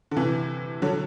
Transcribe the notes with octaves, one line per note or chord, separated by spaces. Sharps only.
D3
C3 E3
D3 F#3